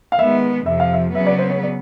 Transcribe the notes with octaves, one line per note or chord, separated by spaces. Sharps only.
F5
D#3 G#3 B3 E5
F2 C3 F3 E5
F5
E5
C#3 F#3 B3 E5
D5
C5
C#5
D5